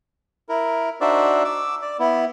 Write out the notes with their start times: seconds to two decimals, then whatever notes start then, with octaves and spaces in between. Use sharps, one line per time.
0.49 E4 A#4
1.01 D4 D#4 F#4 C5 D5 E5
1.45 D6 E6
1.82 D5
1.99 B3 E4